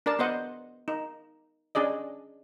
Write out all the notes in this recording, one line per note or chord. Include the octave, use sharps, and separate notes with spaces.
D4 A#4 D5 A5
B3 C5 D#5 F#5
D#4
C#4 D4 G#4 D5 D#5